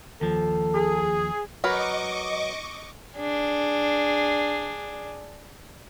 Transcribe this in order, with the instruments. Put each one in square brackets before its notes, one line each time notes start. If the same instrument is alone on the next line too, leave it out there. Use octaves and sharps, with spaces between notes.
[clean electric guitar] D#2 F3 [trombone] A4
[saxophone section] G#4
[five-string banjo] F#3 A#4 B4 [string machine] D#5 C#6 D6
[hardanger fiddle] D4 G#4